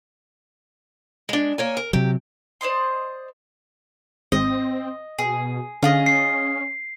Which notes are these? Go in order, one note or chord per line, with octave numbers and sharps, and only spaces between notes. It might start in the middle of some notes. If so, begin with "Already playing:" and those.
G#3 D4
A#3 C#5 G#5
A#4
C3 F#3 G4
C5 D5 D#5 C6
G#1 C4 D#5
B2 G#4
D3 C#4 F4 G#4 D#5
C7